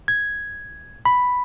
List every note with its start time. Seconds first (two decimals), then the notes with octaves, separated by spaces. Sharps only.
0.08 G#6
1.05 B5